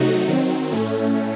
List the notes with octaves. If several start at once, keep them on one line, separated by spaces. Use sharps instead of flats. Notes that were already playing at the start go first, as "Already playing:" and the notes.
Already playing: C3 F#3 A3 D#4 F#4
D#3 F#3 C4
A2 A3 C#4